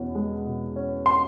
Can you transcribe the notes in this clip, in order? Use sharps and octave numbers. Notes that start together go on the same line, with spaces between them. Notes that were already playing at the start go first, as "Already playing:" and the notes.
Already playing: E2 B2 C#4
G#3
B2
C#4
C6